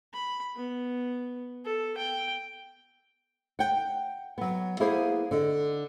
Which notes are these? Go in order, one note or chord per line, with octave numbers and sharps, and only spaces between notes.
B5
B3
A4
G5
F#5 G5
F#3 B3
A#3 B3 E4 G#4 C5 F5
D3 D#5